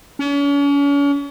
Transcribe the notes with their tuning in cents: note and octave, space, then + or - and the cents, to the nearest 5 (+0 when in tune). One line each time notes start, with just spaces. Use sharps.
C#4 +40